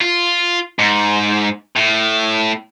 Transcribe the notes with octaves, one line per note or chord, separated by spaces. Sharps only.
F4
G#2
A2